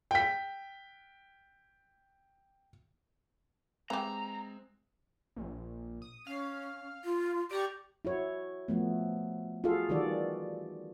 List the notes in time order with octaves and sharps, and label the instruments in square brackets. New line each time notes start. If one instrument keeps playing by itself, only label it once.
[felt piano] G5 B6
[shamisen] E3 G4 [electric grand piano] G#3 C4 [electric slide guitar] A#5
[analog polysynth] A#1
D#6
[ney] C#4 [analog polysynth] F5
[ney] F4
[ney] G4 [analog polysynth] D5 A#5 C#6
[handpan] E4 F#4 C#5
F3 A3 B3
F4 F#4 G#4 A4 F5
D#3 E3 G3 F#4 A4 D5